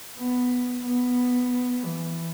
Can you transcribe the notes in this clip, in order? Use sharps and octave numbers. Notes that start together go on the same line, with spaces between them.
B3
B3
E3